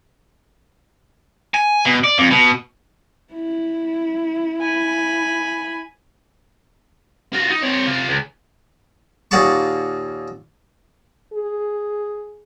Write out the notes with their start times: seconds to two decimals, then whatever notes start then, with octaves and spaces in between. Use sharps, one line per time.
1.54 G#5
1.85 B2
2.04 D5
2.18 F2
2.31 B2
3.33 E4
4.61 G#5 B5
7.33 F4 F#4
7.50 D#4
7.63 C4 C#5
7.87 C3 F4
8.08 C#2
9.31 D#2 A#2 F#4 G#4 A5 C#6
11.33 G#4